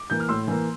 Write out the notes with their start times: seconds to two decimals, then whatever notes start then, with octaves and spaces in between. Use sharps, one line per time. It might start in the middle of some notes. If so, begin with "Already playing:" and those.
Already playing: D6
0.10 E3 A#3 G6
0.20 F6
0.29 A2 C6 E6
0.47 E3 A#3